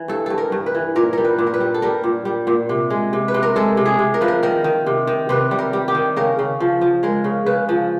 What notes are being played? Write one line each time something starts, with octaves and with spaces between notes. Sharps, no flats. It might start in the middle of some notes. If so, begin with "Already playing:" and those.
Already playing: E3
G2 A4
G2 A4
A#4
G2
B4
E3
A#2 A#4
G3 A#4
B4
A#2
A#4
B4
G3
A4
G3 A#4
A#2
G3
A#2
C3
G#3
C3
B4
C3
A#4
G#3 A4
C3
G#4
C3
A#4
F3 B4
A#4
D#3 A#4
D#3
C3
D#3
C3 B4
G3
A#4
G3
G4
D#3
C#3 A#4
C#3
F3
F3
G#3 A#4
C#3
C#3 B4
F3